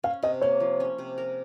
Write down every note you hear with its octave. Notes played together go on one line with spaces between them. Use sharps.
C#4 F5
C3 D#5
A#3 C#5
F3
C#4
C3
A#4